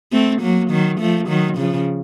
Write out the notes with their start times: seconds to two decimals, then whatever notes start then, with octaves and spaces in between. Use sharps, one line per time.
0.12 A3 C4
0.42 F#3 A#3
0.71 D#3 F#3
1.00 F3 A3
1.29 D#3 F#3
1.57 C#3 F3